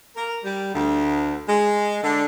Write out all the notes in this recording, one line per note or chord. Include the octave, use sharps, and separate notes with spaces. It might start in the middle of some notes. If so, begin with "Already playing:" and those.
A#4
G3
D2
G#3
D3